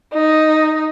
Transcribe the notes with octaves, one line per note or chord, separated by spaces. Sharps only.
D#4